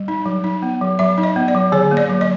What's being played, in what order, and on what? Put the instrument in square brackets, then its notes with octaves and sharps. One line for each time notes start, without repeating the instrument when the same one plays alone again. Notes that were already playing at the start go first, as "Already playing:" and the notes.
Already playing: [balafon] G3
D#4
F#3
D#4
B3
F#3
F#3 E5
D#4
D#5
B3
D5
F#3
D3 C#5
A#3
D5
F#3
D#5